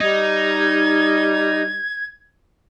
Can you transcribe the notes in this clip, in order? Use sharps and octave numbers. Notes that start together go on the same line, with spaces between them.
G3 D#4 G#6